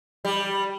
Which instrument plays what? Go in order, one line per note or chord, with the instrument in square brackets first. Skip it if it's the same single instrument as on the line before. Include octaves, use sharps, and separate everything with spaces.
[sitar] G3